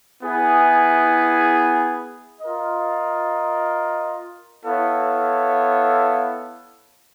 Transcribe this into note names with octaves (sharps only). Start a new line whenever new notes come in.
B3 E4 G#4
F4 A#4 D#5
B3 E4 A4 C#5 F5